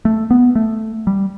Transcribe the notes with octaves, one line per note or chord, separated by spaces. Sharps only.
A3
B3
A3
G3